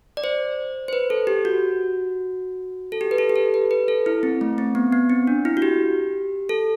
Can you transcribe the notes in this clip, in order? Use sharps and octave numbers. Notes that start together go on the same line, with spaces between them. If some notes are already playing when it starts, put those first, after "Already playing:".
D5
C5
C5
B4
A4
G4
F#4
A4
G4
B4
A4
G4
A4
B4
B4
A4
E4
C4
A3
C4
B3
B3
C4
D4
E4
F#4
G4
A4